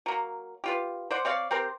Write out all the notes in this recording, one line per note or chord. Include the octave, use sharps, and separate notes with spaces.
F#3 A#3
B3 F4 G4
C5 D5 F#5
C4 C#5 D5 F5
C4 G4 A#4 C5